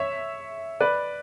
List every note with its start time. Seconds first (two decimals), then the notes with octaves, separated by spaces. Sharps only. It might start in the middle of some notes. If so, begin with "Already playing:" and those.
Already playing: C#5 E5
0.80 B4 D5